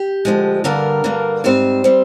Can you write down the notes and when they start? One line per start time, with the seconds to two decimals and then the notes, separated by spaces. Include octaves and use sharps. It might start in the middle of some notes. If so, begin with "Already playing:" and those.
Already playing: G4
0.25 D2 D3 F3 G#3
0.64 G2 D3 G3 A#3 A#4
1.04 G2 D3 G3 A#3
1.44 G#2 G3 C4 C5
1.84 G3 C4